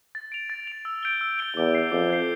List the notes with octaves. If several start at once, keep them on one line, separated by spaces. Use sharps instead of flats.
A6
D7 F7
A6
D7 F7
E6
G6 D7 G7
E6
G6 D7 G7
E2 D6
G6 C7
F2 D6
G6 C7